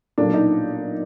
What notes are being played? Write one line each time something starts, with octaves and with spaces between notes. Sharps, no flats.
B1 A#2 D4
D#4